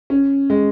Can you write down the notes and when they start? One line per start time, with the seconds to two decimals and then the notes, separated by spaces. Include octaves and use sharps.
0.10 C#4
0.50 G#3